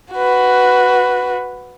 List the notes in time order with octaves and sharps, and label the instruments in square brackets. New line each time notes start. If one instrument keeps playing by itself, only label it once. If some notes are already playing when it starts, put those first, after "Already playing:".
[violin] F#4 B4